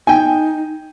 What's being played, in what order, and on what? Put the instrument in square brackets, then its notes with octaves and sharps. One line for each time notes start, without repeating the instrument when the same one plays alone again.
[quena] D#4 [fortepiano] G5 G#5